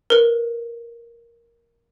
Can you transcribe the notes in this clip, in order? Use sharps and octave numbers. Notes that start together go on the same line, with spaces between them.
A#4 B4